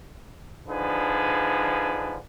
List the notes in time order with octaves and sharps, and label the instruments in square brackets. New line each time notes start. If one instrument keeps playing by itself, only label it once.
[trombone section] D3 F3 D4 D#4 G#4 B4